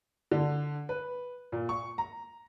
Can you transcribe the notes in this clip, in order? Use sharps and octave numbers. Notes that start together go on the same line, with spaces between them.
D3
B4
A#2
C#6
A#5